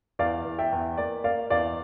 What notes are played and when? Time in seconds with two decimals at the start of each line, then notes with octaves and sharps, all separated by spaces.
0.19 E2 D5 F5
0.45 E2
0.59 E5 G5
0.72 E2
0.97 A#3 D5
1.24 A#3 D5 F5
1.50 E2 D5 F5